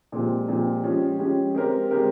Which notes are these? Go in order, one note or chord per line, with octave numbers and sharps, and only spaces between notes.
A#2 F3 G#3 C4 G4
A#2 F3 G#3 C4 G4
F3 G#3 C#4 G4
F3 G#3 C#4 G4
G#3 C4 G4 A#4
G#3 C4 G4 A#4